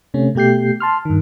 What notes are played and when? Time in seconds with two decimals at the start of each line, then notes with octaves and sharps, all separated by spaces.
0.14 C3 A3 C#4
0.35 B2 A3 G4 G6 C7
0.80 A5 C6 F6
1.05 G2 D#3